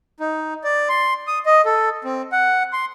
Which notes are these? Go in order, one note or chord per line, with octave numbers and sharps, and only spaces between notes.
D#4
D5
C6
D#6
D#5
A4
C4
F#5
C6